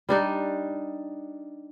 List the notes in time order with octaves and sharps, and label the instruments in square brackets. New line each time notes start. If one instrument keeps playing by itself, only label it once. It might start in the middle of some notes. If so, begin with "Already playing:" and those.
[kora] G3 D4 D#4